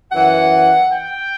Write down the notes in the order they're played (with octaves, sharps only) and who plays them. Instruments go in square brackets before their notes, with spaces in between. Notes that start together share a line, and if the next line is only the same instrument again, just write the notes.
[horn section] F#2 E3 F#5
G5